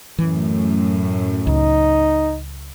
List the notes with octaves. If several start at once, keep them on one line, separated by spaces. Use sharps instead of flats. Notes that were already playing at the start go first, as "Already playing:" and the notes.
F#2 A2 E3
C#2 D#4